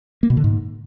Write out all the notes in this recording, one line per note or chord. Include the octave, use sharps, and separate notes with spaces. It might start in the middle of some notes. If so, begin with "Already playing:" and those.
A#3
B2
D3
G#2